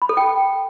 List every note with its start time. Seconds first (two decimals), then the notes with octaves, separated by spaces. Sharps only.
0.02 B5
0.09 A4
0.17 G5